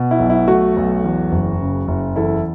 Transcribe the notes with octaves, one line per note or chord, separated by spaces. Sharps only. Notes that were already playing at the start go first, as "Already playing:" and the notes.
Already playing: B2
E4
B1
E4
A3 F#4
B1
E2
F#1
C#3
F#1
E2 E4 A4